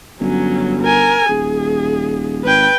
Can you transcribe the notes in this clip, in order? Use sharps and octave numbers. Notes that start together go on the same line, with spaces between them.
G1 F#3 C#4
A#4 G#5
D#1 G#4
G#1 B4 G5